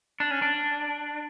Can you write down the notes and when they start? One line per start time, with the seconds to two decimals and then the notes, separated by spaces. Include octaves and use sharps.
0.20 D4
0.31 C#4
0.42 D4